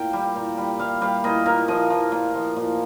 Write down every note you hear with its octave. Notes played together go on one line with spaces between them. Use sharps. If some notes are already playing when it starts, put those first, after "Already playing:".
Already playing: A#2 G5
G3
A#2
G3
G3 F5
G3 F5
A#2 D#5
A#2 A#4
F3 D#5
F3
A#2
F3
A#2